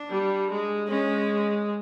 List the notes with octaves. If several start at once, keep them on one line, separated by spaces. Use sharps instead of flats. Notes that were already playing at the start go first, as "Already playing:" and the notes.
Already playing: D4
G3
G#3
G#3 C#4